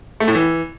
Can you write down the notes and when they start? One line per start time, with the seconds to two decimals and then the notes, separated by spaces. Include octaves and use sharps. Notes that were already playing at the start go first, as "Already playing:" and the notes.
0.20 A3
0.28 A2
0.35 E3